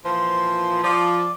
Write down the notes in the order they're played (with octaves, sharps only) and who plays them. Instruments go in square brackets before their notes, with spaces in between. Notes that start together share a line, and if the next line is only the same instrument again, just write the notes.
[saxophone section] A#2 E3 F3 [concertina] C5
[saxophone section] F3 [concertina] D5